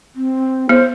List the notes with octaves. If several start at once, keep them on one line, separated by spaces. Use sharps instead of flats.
C4
B3 C5